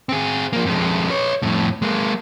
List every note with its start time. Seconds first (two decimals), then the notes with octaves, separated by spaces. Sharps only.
0.09 C4 G#4
0.53 F3 A#3
0.66 F2 G#3
1.10 B4 C#5
1.42 F2 A2
1.82 G#3 A#3